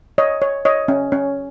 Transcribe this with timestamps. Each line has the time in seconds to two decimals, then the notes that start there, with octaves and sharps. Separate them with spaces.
0.18 C#5 D#5
0.42 C#5
0.65 C#5 D#5
0.88 C#4
1.12 C#4 C#5